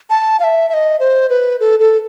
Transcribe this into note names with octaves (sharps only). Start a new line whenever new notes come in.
A5
F5
E5
E5
D#5
C5
B4
A4
A4